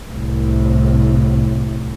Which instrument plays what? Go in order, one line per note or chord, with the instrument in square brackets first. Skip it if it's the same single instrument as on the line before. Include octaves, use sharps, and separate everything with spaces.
[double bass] C2 A2